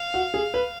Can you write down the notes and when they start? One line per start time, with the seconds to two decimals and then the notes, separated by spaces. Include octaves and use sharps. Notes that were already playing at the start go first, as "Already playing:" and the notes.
Already playing: F5
0.14 F#4
0.34 G#4
0.54 B4